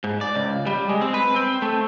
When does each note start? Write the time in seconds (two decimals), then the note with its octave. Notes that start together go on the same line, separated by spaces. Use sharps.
0.04 G#2
0.21 D5
0.35 C#2
0.67 G3
0.89 G#3
1.01 C4
1.14 B4
1.36 C4
1.62 A3